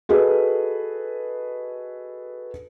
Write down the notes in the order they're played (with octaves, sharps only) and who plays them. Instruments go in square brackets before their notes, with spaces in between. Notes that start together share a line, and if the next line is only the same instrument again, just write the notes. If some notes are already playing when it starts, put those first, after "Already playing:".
[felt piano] F#4 G#4 A4 B4 D#5